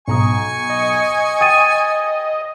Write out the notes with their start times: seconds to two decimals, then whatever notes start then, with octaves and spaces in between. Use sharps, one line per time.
0.08 B1 G#5 A#5 C#6 D#6
0.70 D#5
1.41 G5 D#6 A6 D#7